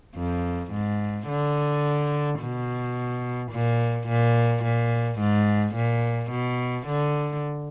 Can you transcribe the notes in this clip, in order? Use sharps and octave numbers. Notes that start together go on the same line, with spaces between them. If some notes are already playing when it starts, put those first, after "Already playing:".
F2
G#2
D3
B2
A#2
A#2
A#2
G#2
A#2
B2
D3